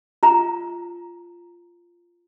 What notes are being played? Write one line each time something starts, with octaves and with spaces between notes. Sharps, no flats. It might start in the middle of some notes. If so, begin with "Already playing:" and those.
F4 A#5